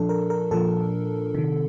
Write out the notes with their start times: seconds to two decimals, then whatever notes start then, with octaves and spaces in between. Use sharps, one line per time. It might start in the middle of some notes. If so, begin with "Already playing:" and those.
Already playing: A#2 F3 D4 A4
0.09 A#4
0.30 A#4
0.51 A#2 F3 A4
1.35 C3 D#3